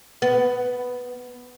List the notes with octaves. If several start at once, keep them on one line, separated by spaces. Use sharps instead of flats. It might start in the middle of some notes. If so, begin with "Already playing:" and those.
B3